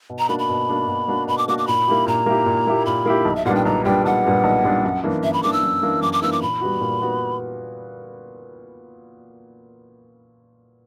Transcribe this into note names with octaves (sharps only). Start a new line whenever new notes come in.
B2
A#5
A#3 D4 F#4 B5
B5
B2
A#3 D4 F#4
B2
A#3 D4 F#4
B2 B5
D6
A#3 D4 F#4 D6
D6
A#2 B5
A#3 E4 G4
A#2 A#5
A#3 E4 G4
A#2
A#3 E4 G4
A#2 B5
A#3 E4 G4
B1
E5
A#2 G3 B3 D4 F#5
G5
B1 A#5
A#2 G3 B3 D4 G5
B1 F#5
A#2 G3 B3 D4
B1
A#2 G3 B3 D4
F#2
E3 A#3 D4
F#2 E5
B5
E3 A#3 D4 D6
E6
F#2
E3 A#3 D4
F#2 D6
D6
E3 A#3 D4 E6
D6
A#2 B5
G3 B3 F#4
A#2
B3 F#4